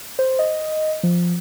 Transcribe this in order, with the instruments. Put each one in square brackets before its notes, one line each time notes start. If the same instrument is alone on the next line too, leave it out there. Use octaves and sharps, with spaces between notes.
[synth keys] C5
D#5
F3